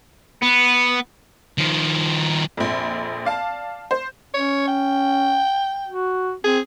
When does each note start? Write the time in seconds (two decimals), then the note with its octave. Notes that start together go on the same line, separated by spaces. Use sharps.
0.43 B3
1.58 D#3 F3
2.57 A#1 F2
3.25 D5 F5 A5
3.91 C5
4.34 C#4 C#5
4.68 G5
5.89 F#4
6.44 C4 G#4